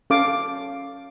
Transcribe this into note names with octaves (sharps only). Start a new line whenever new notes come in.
C#4 A4 F5 D6